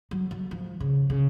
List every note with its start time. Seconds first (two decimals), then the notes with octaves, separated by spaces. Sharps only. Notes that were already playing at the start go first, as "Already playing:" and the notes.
0.11 F#3
0.31 F#3
0.51 F3
0.80 C#3
1.10 C#3